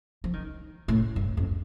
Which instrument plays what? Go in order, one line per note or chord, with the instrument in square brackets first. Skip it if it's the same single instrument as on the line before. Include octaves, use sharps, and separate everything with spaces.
[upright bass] F3
D#3
A2
G2
F2